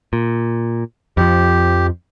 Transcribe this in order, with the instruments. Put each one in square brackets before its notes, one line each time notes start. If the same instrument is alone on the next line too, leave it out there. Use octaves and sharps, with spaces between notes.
[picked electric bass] A#2
[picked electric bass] F2 F3 [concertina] G4